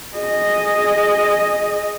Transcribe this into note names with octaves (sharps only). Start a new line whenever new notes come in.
G#4 D#5